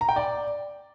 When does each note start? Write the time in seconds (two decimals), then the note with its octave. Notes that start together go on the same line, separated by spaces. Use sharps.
0.01 A#5
0.09 G5
0.16 D5